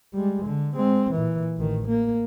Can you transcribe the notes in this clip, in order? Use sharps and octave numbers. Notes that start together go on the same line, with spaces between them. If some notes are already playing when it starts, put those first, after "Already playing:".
G3 G#3
D3
G#3 C4
A#2 E3
A1 D#3
A#3